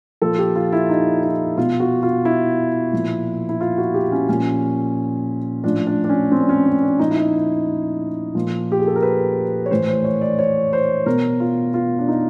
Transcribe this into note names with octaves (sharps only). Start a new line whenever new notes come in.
A#2 F3 A4
G4
F4
E4
D#4
E4
B2 F4
F#4
F4
E4
A#2 F3
E4
F4
F#4
G4
C#4
A#2 F3 C#4
A2 F3 D4
D4
D4
C#4
C4
D4
C#4
C4
D4
A#2 F3 D#4
E4
D#4
A#2 F3
G4
G#4
A4
A#4
B4
C#5
A2 E3 C5
C5
C#5
D5
C#5
C5
B2 A#4
F4
F4
D4
D#4